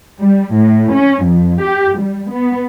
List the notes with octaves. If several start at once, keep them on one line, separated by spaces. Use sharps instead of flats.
G3
A2
C#4
F2
G4
G3
B3